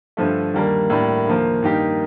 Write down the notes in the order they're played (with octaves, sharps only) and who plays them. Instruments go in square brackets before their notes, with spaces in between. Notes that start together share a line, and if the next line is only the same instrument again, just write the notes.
[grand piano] G2 D3 F3 A3
D#2 D3 G3 A#3 D4
A2 G3 A#3 D4
D#2 D3 F3 A#3
G2 D#3 A#3 D#4 G4